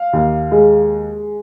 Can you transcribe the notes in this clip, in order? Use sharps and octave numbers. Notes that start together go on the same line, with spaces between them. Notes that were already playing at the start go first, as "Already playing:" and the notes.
Already playing: F5
D#2
G#3